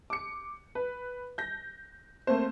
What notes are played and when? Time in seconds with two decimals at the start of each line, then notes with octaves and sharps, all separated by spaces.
0.10 D6 C#7
0.75 B4
1.38 G6 A#6
2.27 A3 A#3 C4 C5